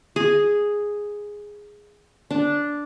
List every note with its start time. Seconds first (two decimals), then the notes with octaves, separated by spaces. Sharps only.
0.16 G#4
2.31 D4